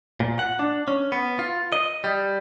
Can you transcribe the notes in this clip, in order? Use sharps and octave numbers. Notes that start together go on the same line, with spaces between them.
A#2
F#5
D4
C#4
B3
F4
D#5
G3